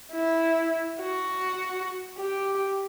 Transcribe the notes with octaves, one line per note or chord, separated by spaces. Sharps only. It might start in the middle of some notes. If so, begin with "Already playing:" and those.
E4
F#4
G4